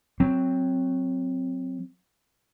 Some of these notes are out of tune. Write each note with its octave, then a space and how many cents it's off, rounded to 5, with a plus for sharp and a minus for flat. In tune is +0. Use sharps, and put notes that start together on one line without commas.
F#3 +0 C4 +0